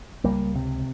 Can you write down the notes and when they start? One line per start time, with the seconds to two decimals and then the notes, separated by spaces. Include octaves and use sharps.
0.24 C#2 G3 A#3
0.56 C3